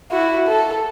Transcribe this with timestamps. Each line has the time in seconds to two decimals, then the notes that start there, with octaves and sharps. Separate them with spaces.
0.11 E4 F#4
0.48 A4